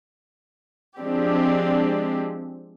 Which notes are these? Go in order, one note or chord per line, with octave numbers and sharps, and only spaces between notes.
F3 G#3 C4 D4 G4